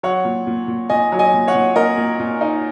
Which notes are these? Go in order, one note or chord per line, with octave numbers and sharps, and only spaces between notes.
F#3 C#5 F#5
A#2
A#2
A#2
A#2 D#5 G#5
F#3
D#5 G#5
A#2
C#5 F#5
A#2
A#2 A#4 D#5
A#2
A#2
D#4